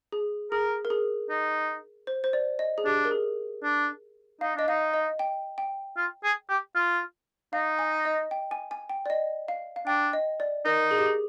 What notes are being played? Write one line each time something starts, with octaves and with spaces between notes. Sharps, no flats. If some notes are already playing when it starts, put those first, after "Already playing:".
G#4
G#4 A#4
A#4
G#4
D#4
C5
C5
D5
D#5
G#4
D4 G4
A#4
G#4
D4
D#4 F5
D4 D#5
D#4 F5
D#5
G5
G5
F4
G#4
G4
F4
D#4 F5
G#5
D#5
G5
G#5
G#5
G5
D5
D#5
F5
F5
D4 G5
D#5
D5
D#4 A#4
G#4
G4
G#4